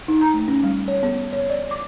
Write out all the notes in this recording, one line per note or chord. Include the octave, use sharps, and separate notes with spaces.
D#4
A#5
A3
C#4
G3
C#5
B3
C#5
D5
D6